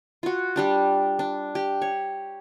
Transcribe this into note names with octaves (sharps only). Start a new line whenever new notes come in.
F4 F#4
G3 D4 G4
D4
G4
C#5